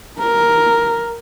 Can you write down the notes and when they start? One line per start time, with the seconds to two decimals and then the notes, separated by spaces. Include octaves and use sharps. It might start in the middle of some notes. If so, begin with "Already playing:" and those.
0.20 A#4